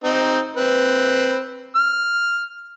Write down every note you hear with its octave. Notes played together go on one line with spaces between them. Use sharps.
C4 D#4
C4 B4
F6